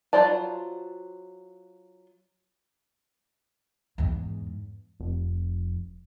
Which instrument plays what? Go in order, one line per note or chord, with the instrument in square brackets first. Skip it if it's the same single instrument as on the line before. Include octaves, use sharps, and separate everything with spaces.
[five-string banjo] F#3 F4 C5 D5 A5
[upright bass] E2 G#2
[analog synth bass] F1